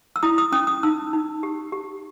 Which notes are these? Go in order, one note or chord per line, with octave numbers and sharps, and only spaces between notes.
E6
E4 D#6
D#6
C#4 D#6
D#6
D#4 E6
D#4
G4
G4